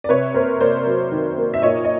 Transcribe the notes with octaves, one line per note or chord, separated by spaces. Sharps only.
D5
C3 B4 C#5
A#3 A#4 C5
A#3 C5 D5
F#3
D#3
A#3
E5
A#2 C#5 D#5
D#5